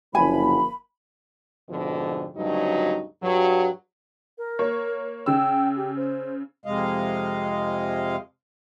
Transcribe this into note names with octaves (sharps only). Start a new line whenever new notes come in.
F#1 D3 F3 A#3 G#5 B5
F2 G#2 B2 D3 F3
D2 G2 C#3 F#3 D#4
G2 F#3
A#4
A#3 C#5
C#3 G5 E6
G4
C5
F2 C3 G#3 D#5 F5